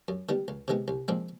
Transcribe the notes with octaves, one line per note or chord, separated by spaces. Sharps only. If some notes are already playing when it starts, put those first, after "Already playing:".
F#2
D#3 G3 B3
C#2
C3 D#3 G#3 B3
C2
A#2 F3 G#3 C4